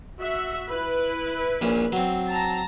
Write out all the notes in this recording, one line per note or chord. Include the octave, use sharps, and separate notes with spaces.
F#4 E5
E4 B4
A#1 A#2 C#4
F#3 C4
A5 A#5